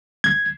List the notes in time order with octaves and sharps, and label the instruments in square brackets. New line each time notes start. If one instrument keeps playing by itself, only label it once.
[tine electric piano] G#6